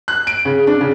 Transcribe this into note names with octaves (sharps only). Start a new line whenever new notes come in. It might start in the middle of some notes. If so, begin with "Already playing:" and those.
F#6
D7
C#3
D4
C#3